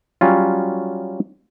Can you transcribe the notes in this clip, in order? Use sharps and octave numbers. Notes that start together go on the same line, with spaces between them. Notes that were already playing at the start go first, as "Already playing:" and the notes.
F#3 G3 C#4 F4